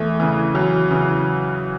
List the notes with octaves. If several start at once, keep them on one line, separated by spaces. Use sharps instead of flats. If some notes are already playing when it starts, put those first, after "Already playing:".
Already playing: E2 A3
C#3 E3
E2 F#3
C#3 E3